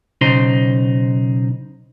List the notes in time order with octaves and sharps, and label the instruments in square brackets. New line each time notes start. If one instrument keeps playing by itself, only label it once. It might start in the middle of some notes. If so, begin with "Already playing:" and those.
[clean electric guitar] B1 C#3 D#4 C5 C6